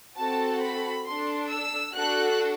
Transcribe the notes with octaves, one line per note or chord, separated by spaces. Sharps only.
C4 F#4 A4 A5
B5
D4 A4 C6
E6
D4 F#4 A4 F#6